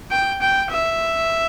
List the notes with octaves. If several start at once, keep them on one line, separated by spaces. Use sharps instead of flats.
G5
G5
E5